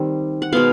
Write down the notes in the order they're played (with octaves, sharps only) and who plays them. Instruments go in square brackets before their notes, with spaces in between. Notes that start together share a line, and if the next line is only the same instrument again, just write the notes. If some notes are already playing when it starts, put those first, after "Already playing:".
Already playing: [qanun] D#3 G3 C4
F#5
B2 G#3 B3 F5